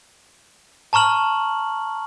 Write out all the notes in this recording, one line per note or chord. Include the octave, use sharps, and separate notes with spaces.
A5 A#5 C#6 F6 F#7